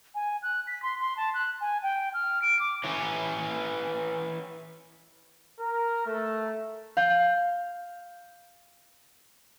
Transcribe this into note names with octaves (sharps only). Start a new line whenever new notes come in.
G#5
F#6
B6
C6
C6
A5
F#6
G#5
G5
F6
D7
D6
E3 C#4
A#4
A3
F5 G6